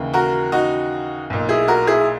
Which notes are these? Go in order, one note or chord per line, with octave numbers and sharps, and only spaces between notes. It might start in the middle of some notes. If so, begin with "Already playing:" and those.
Already playing: D#2 C#3 E3
F#4 A#4
D#4 F#4
B1 A#2
E4 G#4
F#4 A#4
E4 G#4